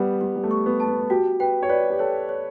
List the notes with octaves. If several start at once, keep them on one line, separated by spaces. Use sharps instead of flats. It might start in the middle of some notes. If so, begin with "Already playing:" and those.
Already playing: G3 B3 F#5
G3 G4
G3
A3
C#6
B3
A5
B3
F#4 G4
B4 G5
C#5
B4 D5
G4
A4 C#5
C#5